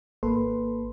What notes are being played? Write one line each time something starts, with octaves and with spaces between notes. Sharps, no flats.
G#1 A#3 A4 B4 C6